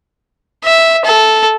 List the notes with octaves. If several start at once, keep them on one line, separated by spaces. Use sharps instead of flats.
E5
A4